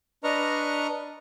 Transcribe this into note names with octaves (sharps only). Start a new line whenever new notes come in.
D4 B4 D#5 A#5 C#6 F6